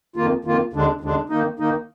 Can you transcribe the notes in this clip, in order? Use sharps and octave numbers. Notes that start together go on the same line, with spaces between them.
F2 D#3 A#3 F4
F2 D#3 A#3 F4
D#2 D3 G#3 D4
D#2 D3 G#3 D4
D#3 A#3 D#4
D#3 A#3 D#4